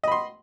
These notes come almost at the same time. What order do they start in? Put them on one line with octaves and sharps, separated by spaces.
D#5 B5 C6